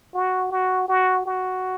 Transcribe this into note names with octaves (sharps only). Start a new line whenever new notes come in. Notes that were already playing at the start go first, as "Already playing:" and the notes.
F#4
F#4
F#4
F#4